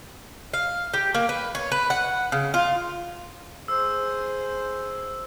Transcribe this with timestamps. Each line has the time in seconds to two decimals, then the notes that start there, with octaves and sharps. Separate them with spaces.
0.54 F5
0.94 G4
1.15 A#3
1.29 B4
1.55 C#5
1.72 B4
1.90 F#5
2.32 C#3
2.54 F4
3.68 G#4 C5 E6